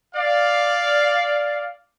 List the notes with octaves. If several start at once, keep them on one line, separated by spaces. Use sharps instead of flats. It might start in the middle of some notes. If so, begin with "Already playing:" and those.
D5 F5